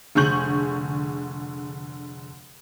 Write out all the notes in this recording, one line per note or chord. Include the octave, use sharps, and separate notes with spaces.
F1 D3 G#4 C#6 G6 F#7